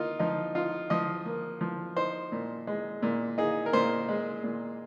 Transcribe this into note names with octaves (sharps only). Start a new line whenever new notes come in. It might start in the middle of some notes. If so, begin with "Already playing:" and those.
Already playing: A#3 D#4 F4
F3 D#4
D#4 F4
F3 D#5
A#3
F3
D#4 C5
A#2
G#3
A#2
D#4 G#4
A#4
A#2 C5
G#3
A#2